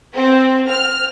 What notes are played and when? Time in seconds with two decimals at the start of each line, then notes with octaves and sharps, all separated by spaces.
0.15 C4
0.69 F6